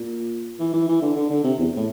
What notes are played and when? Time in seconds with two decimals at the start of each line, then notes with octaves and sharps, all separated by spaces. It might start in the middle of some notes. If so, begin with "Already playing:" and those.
Already playing: A#2
0.59 E3
0.73 E3
0.88 E3
1.02 D3
1.16 D3
1.30 D3
1.44 C3
1.58 E2
1.77 A2